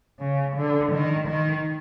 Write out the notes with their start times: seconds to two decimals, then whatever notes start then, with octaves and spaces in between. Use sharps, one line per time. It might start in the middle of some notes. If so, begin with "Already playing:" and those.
0.19 C#3
0.56 D3
0.92 D#3
1.27 D#3